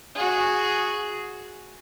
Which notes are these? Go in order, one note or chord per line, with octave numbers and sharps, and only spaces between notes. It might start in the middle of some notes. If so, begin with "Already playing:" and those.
F#4 G#4